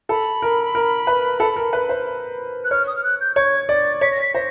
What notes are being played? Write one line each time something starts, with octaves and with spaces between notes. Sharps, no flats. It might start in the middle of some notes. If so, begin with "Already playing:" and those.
A4 B5
A#4
A#4
B4
A4
A#4
B4
C5
F#6
C#5 F6
D#6
F6
F#6
G6
C#5 G#6
D5 A6
C#5 B6
A#6
B6
C5 A#6